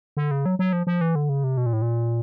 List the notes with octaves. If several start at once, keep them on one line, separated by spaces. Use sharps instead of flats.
D3
C#3
F#3
F#3
F3
F3
E3
D3
C#3
C3
B2
A#2
A2
A#2